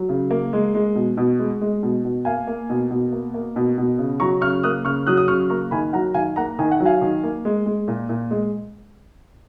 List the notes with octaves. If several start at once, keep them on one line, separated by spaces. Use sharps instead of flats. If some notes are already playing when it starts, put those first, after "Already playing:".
Already playing: F#3
C#3
A#3
G#3
G#3
B2
B2
G#3
G#3
B2
B2
A#3 F5 G#5
A#3
B2
B2
A#3
A#3
B2
B2
C#3
F#3 A#5 C#6
C#3 C#6 F6
A#3 D#6 F#6
C#3 C#6 F6
F#3 D#6 F#6
D#6
C#3 C#6 F6
A#3 A#5 C#6
D#3 G#5 B5
F#3 F#5 A#5
D#3 F5 G#5
A#3 F#5 A#5
D#3 G#5
F#5
F#3
F5 G#5
D#3
A#3
G#3
G#3
A#2
A#2
G#3